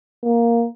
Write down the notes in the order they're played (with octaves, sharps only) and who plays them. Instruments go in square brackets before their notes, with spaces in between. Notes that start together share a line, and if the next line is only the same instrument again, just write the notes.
[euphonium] A#3